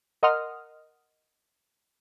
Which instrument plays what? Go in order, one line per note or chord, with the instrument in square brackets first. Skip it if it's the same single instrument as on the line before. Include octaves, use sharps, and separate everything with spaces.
[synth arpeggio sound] A#4 D#5 F#5 C6 D#6 F6